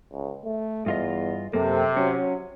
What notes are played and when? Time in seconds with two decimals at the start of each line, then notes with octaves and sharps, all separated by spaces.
0.12 C#2
0.45 A3
0.86 E2 G2 F4 D#5
1.53 F#2 C3 A#3 A4
1.97 F#3 C#4